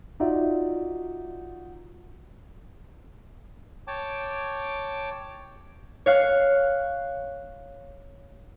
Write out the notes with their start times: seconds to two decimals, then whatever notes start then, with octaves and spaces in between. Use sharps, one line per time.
0.20 D#4 F4 F#4 D5 E5
3.87 C#5 G5 A5 D6
6.06 C#5 F5 F#6